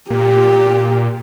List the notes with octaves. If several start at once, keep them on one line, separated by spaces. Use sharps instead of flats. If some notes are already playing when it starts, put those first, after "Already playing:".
A#2 G4